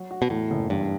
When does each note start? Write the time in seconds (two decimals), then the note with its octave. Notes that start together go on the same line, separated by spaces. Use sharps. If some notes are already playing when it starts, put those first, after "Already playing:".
Already playing: F#3
0.11 F#4
0.22 B2
0.30 E2 A2
0.50 F#1
0.70 E2 G2